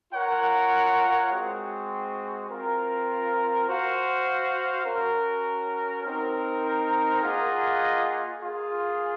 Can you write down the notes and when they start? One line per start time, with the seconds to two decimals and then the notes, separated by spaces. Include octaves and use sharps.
0.12 F4 A#4 C#5 F#5
1.29 G#3 C4 F#4
2.48 C4 F4 A#4
3.67 F#4 C5 F5
4.84 C#4 F#4 A#4
6.03 C4 D#4 A#4
7.22 A#3 F4 G#4 D#5 F#5
8.40 A#3 F4 G#4